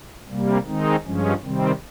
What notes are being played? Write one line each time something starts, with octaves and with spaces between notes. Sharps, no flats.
C3 G3 A#3
D#3 G#3 C4 D#4
G2 F3 G#3 C#4
C3 D#3 G3 C4